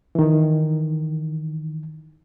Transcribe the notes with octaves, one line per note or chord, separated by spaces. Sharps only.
D#3 E3